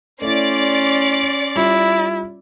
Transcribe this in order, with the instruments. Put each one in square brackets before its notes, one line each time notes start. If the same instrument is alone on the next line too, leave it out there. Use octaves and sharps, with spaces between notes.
[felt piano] A3 E4 [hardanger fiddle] C#4 C6 [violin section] D5
[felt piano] G3 F4 [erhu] E4